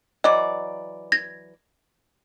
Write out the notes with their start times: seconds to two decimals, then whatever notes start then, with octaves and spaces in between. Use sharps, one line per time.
0.24 E3 F#3 D5 D#5
1.12 G#6 A#6